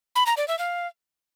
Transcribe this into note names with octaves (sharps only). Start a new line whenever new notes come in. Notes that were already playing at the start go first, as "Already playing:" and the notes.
B5
A#5
D5
E5
F5